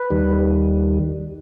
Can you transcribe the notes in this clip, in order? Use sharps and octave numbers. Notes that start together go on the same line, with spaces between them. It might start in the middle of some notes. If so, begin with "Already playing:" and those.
Already playing: B4
D#2 D#3 G3